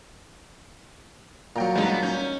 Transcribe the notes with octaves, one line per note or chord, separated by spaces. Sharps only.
A#2 F#3 G5 A#5
G3 G#3 B3 D4 D#4
C#4 G6